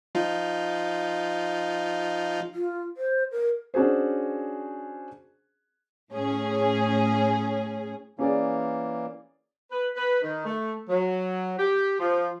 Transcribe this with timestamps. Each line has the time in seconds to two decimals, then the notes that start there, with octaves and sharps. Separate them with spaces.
0.15 F3 D#4 F4
2.53 F4
2.97 C5
3.32 A#4
3.74 C#4 D4 F#4 G#4 C5
6.13 A2 C#4 G#4
8.19 E3 A#3 C#4 G#4 D5
9.72 B4
9.96 B4
10.22 D#3
10.45 A3
10.89 F#3
11.59 G4
11.99 F3